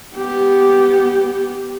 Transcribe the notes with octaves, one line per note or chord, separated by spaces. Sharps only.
B3 G4